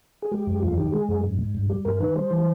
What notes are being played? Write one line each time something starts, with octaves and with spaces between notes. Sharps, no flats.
G#4
G#3 G4
F#2
E2 F4
D#3 G4
G#3 G#4
F#2
G#2
G#2
G2
G3
G2 A#4
D#3 B4
G3 C5
E3